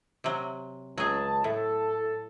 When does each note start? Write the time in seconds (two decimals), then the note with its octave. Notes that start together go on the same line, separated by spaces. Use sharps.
0.24 C3 F#3
0.98 C#2 F#3 G#3 G#4 A5
1.44 A2 A4